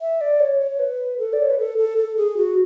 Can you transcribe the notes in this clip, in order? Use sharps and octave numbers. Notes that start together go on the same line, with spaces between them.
E5
D5
C#5
C#5
B4
A4
D5
C#5
B4
A4
A4
A4
G#4
F#4